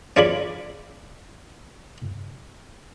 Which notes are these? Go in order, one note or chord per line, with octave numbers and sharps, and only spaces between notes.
C#4 F4 G#4 D5 B5